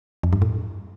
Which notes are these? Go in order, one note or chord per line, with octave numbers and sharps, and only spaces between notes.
F2
G2
A2